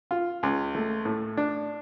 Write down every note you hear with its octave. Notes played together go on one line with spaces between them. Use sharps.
F4
C#2
A3
A2
D4